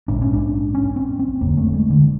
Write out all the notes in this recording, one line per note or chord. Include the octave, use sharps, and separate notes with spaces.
A#1 G#2 D4
C#4
D4
C#4
C4
C4
F1 F2 D3 A#3
A3
G#3
D3